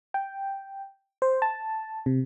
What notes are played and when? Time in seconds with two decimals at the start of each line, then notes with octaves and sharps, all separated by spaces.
0.14 G5
1.22 C5
1.42 A5
2.06 C3